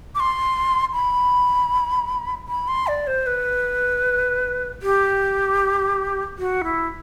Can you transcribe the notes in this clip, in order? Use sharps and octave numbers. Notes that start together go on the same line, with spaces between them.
D6
C6
B5
B5
C6
D5
C5
B4
G4
F#4
E4